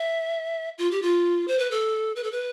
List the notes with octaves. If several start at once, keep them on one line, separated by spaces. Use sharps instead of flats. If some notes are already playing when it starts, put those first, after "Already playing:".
Already playing: E5
F4
G4
F4
C5
B4
A4
B4
A4
B4